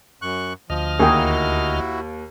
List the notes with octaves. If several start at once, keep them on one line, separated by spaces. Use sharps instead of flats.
F#2 C#6 F#6
D2 F3 D#5 F6
D#2 A#3 E4 F#4 G#4 A#4 G5